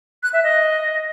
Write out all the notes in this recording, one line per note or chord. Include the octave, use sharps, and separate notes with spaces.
F#6
E5
D#5